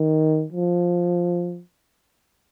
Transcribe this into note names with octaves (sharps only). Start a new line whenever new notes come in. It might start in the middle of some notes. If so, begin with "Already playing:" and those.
Already playing: D#3
F3